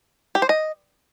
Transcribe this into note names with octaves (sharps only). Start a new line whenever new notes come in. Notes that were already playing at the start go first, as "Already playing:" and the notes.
G4
C5
D#5